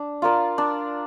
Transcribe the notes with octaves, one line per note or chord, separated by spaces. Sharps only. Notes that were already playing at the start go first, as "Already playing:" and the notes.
Already playing: D4
F4 A#4 D5
D4